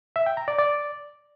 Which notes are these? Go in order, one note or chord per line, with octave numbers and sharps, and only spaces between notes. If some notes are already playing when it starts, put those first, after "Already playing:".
E5
G5
A#5
D5
D5